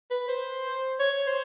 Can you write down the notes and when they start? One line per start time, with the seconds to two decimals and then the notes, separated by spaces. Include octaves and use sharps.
0.11 B4
0.28 C5
1.00 C#5
1.27 C5